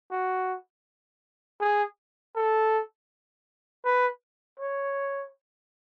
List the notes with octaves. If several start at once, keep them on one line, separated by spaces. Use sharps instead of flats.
F#4
G#4
A4
B4
C#5